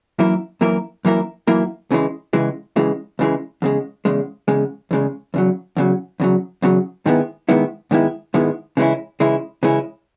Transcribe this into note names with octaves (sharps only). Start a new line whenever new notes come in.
F#2 E3 A#3 E4 A#4
F#2 E3 A#3 E4 A#4
F#2 E3 A#3 E4 A#4
F#2 E3 A#3 E4 A#4
C#2 C#3 E3 G#3
C#2 C#3 E3 G#3
C#2 C#3 E3 G#3
C#2 C#3 E3 G#3
E2 C#3 G#3
E2 C#3 G#3
E2 C#3 G#3
E2 C#3 G#3
E2 C#3 F#3
E2 C#3 F#3
E2 C#3 F#3
E2 C#3 F#3
G#2 D#3 G#3 B3 E4
G#2 D#3 G#3 B3 E4
G#2 D#3 G#3 B3 E4
G#2 D#3 G#3 B3 E4
C#3 E3 G#3 C#4 E4
C#3 E3 G#3 C#4 E4
C#3 E3 G#3 C#4 E4